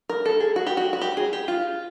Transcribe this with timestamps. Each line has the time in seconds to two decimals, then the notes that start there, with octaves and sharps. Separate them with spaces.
0.09 A#4
0.26 A4
0.40 G#4
0.56 F#4
0.67 G4
0.77 F#4
0.93 F#4
1.01 G4
1.17 G#4
1.33 G4
1.48 F4